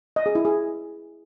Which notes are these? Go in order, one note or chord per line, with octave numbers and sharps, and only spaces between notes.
D#5
G#4
E4
G#4